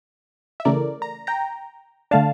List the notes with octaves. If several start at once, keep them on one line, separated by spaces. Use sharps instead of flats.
E5
C#3 E3 A3 A#4 D5
A#5
G5 A#5
D3 A3 D4 F5 A5